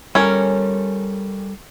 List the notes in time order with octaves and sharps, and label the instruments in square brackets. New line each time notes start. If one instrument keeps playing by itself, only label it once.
[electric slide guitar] G3 A4 [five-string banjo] C#4 A#4